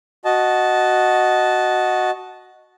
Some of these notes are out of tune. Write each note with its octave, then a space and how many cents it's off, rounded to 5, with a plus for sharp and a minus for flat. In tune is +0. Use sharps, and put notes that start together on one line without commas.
F#4 +0 D#5 +0 A5 -15